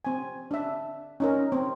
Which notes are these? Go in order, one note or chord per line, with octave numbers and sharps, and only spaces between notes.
C4 G#5
D4 E5
C#4 D#4 A#4
C4